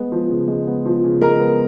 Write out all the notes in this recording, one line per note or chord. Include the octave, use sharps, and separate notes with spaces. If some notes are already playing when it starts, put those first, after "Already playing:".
Already playing: G#3 B3
F3
C#3
G#3
B3
F3
C#3
G#3 A#4 A#5
B3